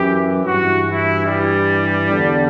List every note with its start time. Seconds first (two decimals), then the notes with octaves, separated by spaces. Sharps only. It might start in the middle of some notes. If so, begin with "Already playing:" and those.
Already playing: F#2 E3 G4
0.45 G2 E3 F#4
0.86 E4
1.26 G3
2.09 E2 D3